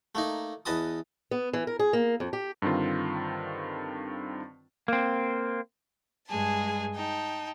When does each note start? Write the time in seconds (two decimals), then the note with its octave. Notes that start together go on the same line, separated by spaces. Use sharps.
0.15 A3 A#3 D#4
0.66 E2 B4 D#5 A5 D#6
1.31 B3
1.53 E3
1.67 A#4
1.79 G#4
1.93 A#3
2.20 F2
2.33 G4
2.62 G2 D3 D#3 C4 F4
4.88 A#3 C4
6.27 G2 G#3 G#4 G#5 A5
6.95 D#4 G5 A5